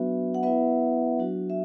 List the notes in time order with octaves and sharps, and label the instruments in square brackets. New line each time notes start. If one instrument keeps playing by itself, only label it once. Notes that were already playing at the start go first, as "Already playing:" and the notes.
Already playing: [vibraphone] F#3 B3 D4 F#4 B4 E5
F#5
B3 E4 B4 E5
F#3 D4 F#4
E5